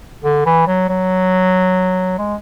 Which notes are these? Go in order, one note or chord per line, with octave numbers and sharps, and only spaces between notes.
D3
E3
F#3
F#3
G#3